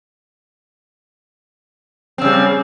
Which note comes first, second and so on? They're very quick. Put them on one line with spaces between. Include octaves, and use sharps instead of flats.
C4 C#3 G3